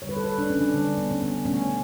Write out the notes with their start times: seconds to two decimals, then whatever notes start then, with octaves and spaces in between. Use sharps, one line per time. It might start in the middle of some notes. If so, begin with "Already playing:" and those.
0.02 D3 G3 C#5
0.09 B4
0.17 A4
0.24 B4
0.38 D4
0.50 C#4
0.61 D4
0.74 D3 G3 C#4
0.98 B3
1.11 C#4
1.22 B3
1.46 B2 A3 C#4